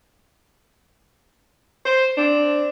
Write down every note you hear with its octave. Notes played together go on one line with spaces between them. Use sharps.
C5
C4 D4